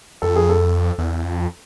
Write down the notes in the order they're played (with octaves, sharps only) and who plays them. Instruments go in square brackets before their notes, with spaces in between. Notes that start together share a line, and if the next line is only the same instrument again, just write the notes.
[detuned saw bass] F2 [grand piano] A4
[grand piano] G#4
A4
[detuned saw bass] E2
F2